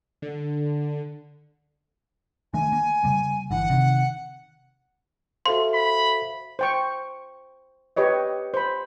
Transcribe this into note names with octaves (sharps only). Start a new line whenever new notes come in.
D3
D#3 A3 D4 G#5
A#3
C#3 G3 A#3
G1 D3 E3 F#5
C3 D#3
F#4 A4 C5 E5 F5 C6
B5
C5 G5 C#6
G4 B4 C#5 D#5
C5 B5